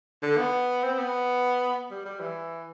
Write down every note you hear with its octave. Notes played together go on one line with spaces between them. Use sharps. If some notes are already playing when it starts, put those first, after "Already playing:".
D3
B3
C4
B3
G3
G3
E3